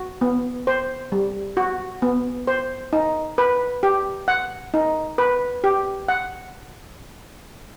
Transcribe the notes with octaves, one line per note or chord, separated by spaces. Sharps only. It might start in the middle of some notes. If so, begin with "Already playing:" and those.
Already playing: F#4
B3
C5
G3
F#4
B3
C5
D#4
B4
G4
F#5
D#4
B4
G4
F#5